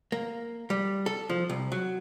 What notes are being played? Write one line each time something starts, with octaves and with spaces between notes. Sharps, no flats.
A#3
G3
A4
F3
C2
F#3